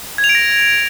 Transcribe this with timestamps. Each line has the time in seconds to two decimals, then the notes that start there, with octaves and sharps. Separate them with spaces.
0.18 G#6
0.24 F7
0.29 D7
0.35 A#6